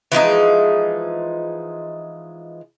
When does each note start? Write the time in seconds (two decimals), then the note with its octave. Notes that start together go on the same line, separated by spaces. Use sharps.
0.12 E3 F3 G#3 D#4